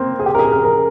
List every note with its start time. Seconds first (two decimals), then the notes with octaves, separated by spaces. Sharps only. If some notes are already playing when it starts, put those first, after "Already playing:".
Already playing: A#3 C4
0.19 G#4
0.26 G4
0.35 A#4
0.39 G#4
0.52 A#4
0.65 A#4